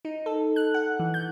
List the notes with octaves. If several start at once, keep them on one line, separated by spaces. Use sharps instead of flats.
D#4
A4
F#6
F#5
E3
G6